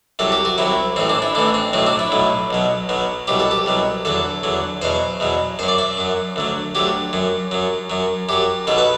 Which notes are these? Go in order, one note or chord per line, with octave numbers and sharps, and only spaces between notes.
C2 C3 F#3 A4
G4
F#4
C2 C3 F#3 E4
A1 A2 E3 C4
D4
E4
A1 A2 E3 D4
C4
B1 A2 F#3 C4
D4
E4
B1 A2 F#3
B1 B2 F#3
B1 B2 F#3
C2 B2 F#3 G4
A4
G4
C2 B2 F#3
E2 D3 F#3 A4
E2 D3 F#3
E2 B2 F#3 C5
E2 B2 F#3
F#2 F#3 C5
D5
E5
F#2 F#3
D2 D3 F#3
D2 D3 F#3 G4
F#2 F#3
F#2 F#3
F#2 F#3
F#2 F#3 G4
B1 B2 F#3 A4
B4